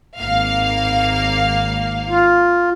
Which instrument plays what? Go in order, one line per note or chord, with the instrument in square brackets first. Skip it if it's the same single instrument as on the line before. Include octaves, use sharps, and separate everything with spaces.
[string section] G#1 A#3 F5
[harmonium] F4